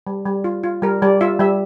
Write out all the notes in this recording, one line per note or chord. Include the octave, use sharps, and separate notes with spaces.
G3
G3
F4
F4
G3 A#4
G3 D5
F4 E5
G3 E5